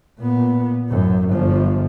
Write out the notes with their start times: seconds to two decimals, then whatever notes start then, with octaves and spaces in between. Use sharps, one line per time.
0.19 A#2 B3
0.90 A1 F#2
1.30 G1 F3